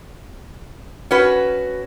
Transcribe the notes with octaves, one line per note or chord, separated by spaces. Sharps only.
C#4 F#4 B4